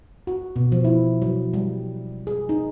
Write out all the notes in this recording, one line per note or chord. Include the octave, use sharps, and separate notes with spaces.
F#4
B2
F3
E4
F#3
G3
G#4
D#4